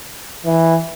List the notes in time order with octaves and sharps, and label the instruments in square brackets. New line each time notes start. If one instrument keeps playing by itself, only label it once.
[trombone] E3